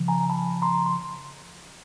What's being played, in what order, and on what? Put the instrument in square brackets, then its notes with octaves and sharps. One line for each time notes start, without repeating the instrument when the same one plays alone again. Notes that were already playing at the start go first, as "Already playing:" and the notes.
Already playing: [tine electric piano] C#3 F3
G#5 A#5
A5 B5
A#5 C6
C6